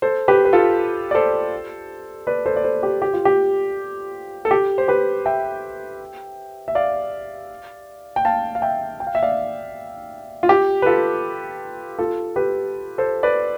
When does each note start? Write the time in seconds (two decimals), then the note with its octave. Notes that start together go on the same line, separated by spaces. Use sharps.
0.02 A4 C5
0.28 G4 B4
0.45 B4
0.53 F4 A4
1.11 D5
1.15 A4 C5
2.27 B4 D5
2.46 A4 C5
2.56 D5
2.64 A4 C5
2.83 G4
3.02 G4
3.13 F4
3.25 G4
4.45 A4
4.51 G4
4.78 C5
4.88 G4 B4
5.26 E5 G5
6.68 E5
6.75 D5 F5
8.16 G5
8.25 F5 A5
8.55 F5
8.62 E5 G5
9.00 G5
9.07 F5
9.15 E5
9.23 D5 F5
10.43 F4
10.49 G4
10.82 B4
10.86 F4 A4
11.99 F4 A4
12.36 G4 B4
12.98 A4 C5
13.23 B4 D5